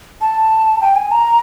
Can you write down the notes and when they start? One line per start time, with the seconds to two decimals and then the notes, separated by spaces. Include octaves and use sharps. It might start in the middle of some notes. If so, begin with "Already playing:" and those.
0.21 A5
0.81 G5
0.96 G#5
1.11 A#5